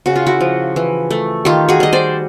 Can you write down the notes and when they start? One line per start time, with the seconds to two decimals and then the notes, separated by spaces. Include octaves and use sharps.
0.06 C#3 F#4
0.16 F4
0.27 E4 F#4
0.41 F3
0.76 E3
1.11 A3
1.45 D#3 F4 G4
1.69 F#4 G#4
1.80 G3 D#5
1.93 C5 D5